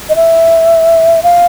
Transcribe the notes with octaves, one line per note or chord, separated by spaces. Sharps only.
D#5
E5
F5